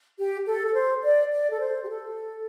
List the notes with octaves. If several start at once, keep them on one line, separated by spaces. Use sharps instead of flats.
G4
A4
A4
C5
D5
D5
A4
C5
G4
A4